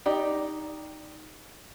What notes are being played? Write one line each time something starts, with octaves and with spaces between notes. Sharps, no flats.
D#4 G4 D5